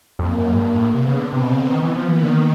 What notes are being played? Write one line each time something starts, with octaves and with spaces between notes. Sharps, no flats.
F2 A#3
F#2
G#2
G2
A2
C3 B3
C#3
D3
C3 C4
B2
C#3
D3
D#3 B3
E3
F3
E3 A#3
D3
D#3